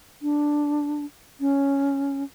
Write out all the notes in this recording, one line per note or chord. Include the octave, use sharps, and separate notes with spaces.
D4
C#4